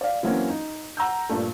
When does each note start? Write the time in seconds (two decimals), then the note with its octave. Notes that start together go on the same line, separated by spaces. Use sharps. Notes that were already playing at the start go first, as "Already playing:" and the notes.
0.01 D5 F5
0.23 E3 F#3 A#3 C4 C#4
0.50 D#4
0.97 F#5 A#5 E6 G6
1.29 G2 A#2 A3